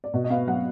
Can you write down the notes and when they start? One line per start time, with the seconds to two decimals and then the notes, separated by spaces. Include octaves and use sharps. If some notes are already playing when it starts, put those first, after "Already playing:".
0.04 D5
0.14 B2 D#5
0.24 D#5
0.30 B3 F5
0.47 F#3 F#5